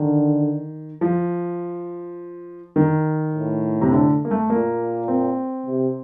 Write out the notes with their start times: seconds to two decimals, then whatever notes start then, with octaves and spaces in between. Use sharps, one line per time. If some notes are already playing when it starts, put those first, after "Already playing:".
Already playing: D3 D#3
1.01 F3
2.76 D#3
3.34 A2
3.81 C3
3.91 D3
4.25 A#3
4.31 A3
4.50 A#2 A#3
5.08 C4
5.66 C3